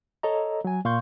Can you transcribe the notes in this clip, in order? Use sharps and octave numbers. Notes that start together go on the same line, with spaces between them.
A4 C#5 D#5 A#5
F#3 G#5
A#2 F5 C6 C#6 G6